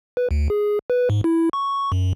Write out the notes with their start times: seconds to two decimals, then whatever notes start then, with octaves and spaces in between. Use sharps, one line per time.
0.17 B4
0.31 D2
0.50 G#4
0.90 B4
1.10 G#2
1.24 E4
1.53 C#6
1.92 F#2